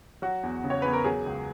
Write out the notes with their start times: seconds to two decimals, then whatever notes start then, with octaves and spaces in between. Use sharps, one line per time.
0.22 F#3 F#4
0.43 E2
0.64 C#3
0.70 C#5
0.82 E2 B4
0.93 A#4
1.05 F#3 G#4
1.26 C#2